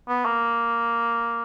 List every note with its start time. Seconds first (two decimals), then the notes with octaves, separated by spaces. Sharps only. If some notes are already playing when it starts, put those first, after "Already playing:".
0.08 B3
0.25 A#3